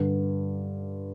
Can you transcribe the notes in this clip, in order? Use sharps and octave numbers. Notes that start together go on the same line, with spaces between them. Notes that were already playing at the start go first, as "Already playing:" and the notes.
Already playing: G2 D3